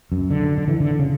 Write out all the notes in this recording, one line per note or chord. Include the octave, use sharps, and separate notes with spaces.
F#2
D3
D3
E3
D3
C#3